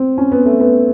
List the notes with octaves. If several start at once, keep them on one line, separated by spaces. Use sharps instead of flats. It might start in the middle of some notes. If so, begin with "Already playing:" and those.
Already playing: C4
C#4
B3
A3
B3